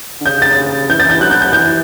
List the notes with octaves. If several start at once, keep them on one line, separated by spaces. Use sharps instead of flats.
D3
C#3 G6
A6
E3 G6
A6
E3 G6
F#3 F#6
G6
G6
E3 G6